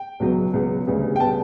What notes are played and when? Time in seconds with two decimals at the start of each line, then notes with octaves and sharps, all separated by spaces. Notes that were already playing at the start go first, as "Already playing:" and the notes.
Already playing: G5
0.20 C#2 B2 F#3 B3
0.53 C#2 B2 F#3 B3
0.86 D2 C#3 G3 B3
1.16 G5
1.20 C#3 G3 B3 A5